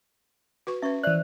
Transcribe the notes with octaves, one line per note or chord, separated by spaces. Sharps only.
F#4 B4 C#6
C#4 B4 E5 C#6
E3 C5 D5 E5 F#6